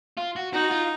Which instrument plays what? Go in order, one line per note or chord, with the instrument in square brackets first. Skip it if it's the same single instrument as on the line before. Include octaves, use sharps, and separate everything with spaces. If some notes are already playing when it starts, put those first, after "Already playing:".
[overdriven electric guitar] F4
F#4
[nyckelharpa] D#4 [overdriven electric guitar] F#4
[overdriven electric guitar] F4